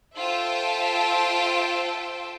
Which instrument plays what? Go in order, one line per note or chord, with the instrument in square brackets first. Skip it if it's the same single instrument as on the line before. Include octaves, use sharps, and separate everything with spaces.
[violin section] F4 A4 C5 E5 G5 A5